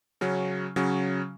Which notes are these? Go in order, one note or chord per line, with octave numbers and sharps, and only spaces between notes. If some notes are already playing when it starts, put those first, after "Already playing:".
C#3 F#3 C#4
C#3 F#3 C#4